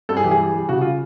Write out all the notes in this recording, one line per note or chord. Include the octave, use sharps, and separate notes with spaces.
G2 A4
G#4
E3 G4
G#4
G3
G3
C#3 F#4
F4